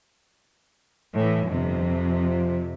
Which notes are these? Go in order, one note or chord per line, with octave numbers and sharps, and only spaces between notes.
A2 E3
G1 F2 C3
F3